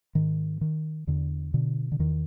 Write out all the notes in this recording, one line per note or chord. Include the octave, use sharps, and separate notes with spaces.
G#2 D#3
D#3
E2 D3
B2 D3
D3
E2 D#3